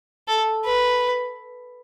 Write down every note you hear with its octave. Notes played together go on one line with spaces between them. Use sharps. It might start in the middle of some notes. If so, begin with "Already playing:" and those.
A4
B4